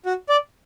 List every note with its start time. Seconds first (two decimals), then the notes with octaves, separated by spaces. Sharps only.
0.06 F#4
0.29 D5